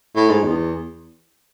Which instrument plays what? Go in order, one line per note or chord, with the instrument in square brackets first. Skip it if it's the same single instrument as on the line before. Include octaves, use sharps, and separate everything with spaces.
[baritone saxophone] A2
G#2
E2